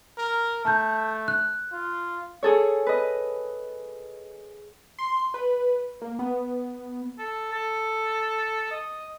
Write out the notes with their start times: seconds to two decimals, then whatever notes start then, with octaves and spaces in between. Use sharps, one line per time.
0.18 A#4
0.65 A3 A5 G6
1.28 F#6
1.73 F4
2.43 G#4 A4 C#5
2.86 B4 D#5
4.99 C6
5.34 B4
6.02 A#3
6.19 B3
7.19 A4
7.52 A4
8.71 D#5